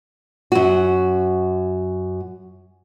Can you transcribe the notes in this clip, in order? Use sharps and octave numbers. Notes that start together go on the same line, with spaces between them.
F#2 F#4